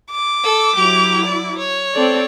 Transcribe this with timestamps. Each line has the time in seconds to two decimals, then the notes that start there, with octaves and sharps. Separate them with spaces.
0.12 D6
0.44 A4 E6
0.75 F#3 E4 G4 F7
1.25 D5
1.58 C#5
1.94 C4 A4 D5